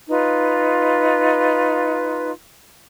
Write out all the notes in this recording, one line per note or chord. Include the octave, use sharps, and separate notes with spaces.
D#4 F4 B4